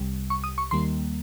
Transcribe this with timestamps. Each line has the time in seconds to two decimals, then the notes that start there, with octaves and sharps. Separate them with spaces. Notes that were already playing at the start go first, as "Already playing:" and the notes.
Already playing: C2 C3 G3
0.30 C#6
0.44 D#6
0.58 C#6
0.71 D#2 D#3 G3 A#3 C6